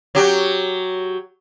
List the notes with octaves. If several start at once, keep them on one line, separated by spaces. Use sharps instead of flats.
F#3 G4